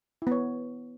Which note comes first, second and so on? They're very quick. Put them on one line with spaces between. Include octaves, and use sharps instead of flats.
E4 B3 C#5